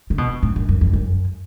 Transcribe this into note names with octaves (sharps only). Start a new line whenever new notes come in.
C#3
B2
A2
F#2
F#2
F2
F#2